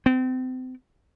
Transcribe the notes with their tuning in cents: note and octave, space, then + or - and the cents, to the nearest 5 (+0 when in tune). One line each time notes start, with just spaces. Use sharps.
C4 -35